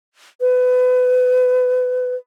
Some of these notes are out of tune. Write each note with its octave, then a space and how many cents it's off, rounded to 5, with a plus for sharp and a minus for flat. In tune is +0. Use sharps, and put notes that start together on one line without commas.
B4 +30